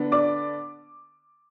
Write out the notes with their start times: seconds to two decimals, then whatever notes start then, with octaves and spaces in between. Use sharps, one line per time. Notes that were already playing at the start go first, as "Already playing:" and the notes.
Already playing: D3 B3 D4
0.12 D5 D6